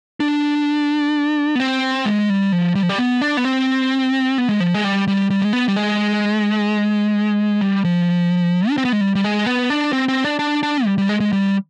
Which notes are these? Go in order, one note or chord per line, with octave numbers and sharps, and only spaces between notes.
D4
B3
C4
G#3
G3
F3
G3
F3
G3
B3
D4
B3
C4
B3
G#3
F3
G#3
G3
G3
G3
G#3
B3
G3
G#3
G3
F3
D4
C4
B3
G#3
G3
G3
G#3
B3
D4
C4
C4
D4
D4
D4
G3
G3
G#3
G#3
G3